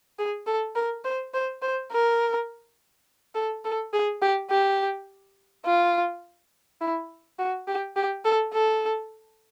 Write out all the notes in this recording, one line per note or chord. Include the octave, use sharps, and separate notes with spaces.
G#4
A4
A#4
C5
C5
C5
A#4
A4
A4
G#4
G4
G4
F4
E4
F#4
G4
G4
A4
A4